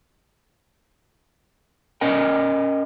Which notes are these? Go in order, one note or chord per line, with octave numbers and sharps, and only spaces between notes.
C#4 A#4 D#5 G5